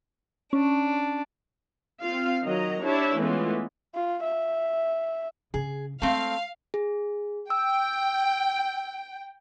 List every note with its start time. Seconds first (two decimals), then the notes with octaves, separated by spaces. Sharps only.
0.53 C#4 D4
2.01 C4 F4 F5
2.43 D#3 F#3 D#5 A#5
2.83 D4 E4 G4 C#5 E5 A5
3.18 E3 G#3 A3 B3 C#4 F4
3.95 F4
4.23 E5
5.54 C#3 G#4
6.02 G#3 A3 C4 F5
6.74 G#4
7.50 G5 E6